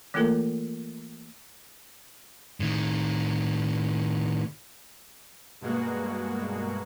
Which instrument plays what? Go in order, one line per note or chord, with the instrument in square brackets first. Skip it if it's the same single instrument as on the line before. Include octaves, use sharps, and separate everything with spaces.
[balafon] E3 A3 A#3 F4 A4 A#4
[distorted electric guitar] A2 D#3
[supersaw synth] G2 B2 G#3 A#3 F#4